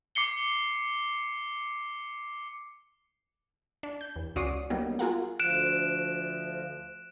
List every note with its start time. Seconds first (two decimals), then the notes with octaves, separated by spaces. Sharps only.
0.15 D6 C7 C#7 G7
3.83 D4
4.01 G6
4.16 E2
4.36 C#2 C#4 F#4 D5 D#6 C7
4.70 F#3 G3 A#3 B3 D#4
4.99 F4 F#4 G#4 A#4 F5 F#5
5.40 D2 F3 F#6 D7 E7